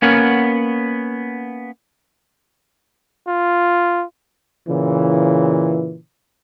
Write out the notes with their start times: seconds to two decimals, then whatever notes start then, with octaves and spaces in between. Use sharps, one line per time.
0.02 A#3 B3 C#4 A#4 C#5 F#5
3.27 F4
4.67 A#2 C#3 E3